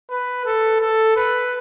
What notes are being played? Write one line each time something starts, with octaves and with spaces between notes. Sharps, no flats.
B4
A4
A4
B4